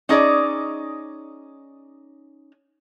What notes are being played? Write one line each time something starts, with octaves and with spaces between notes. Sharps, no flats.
C#4 D#4 G#4 D5